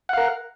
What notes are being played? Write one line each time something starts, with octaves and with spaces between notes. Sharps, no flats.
A#4 F5 F#5